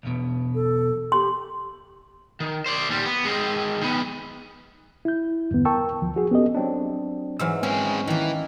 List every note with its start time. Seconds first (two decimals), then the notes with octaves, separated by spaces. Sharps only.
0.03 B1 E2 B2
0.54 A4
1.12 G4 C6
2.40 D#3
2.66 C5 D5
2.89 D#2 G3
3.05 B3
3.25 G#3 C4
3.81 D#3 B3
5.05 E4 G6
5.51 E2 G2 D3 B3
5.65 A#4 G5 A5 C#6 E6
6.02 D2 F3
6.16 F#4 G#4
6.31 B3 C#4 G4 A4 D#5
6.55 F#3 C4 D4
7.39 G#2 E3 F#3 E6 F6
7.63 G#3 C4 C#4 B4
8.07 D#3 E3 A#3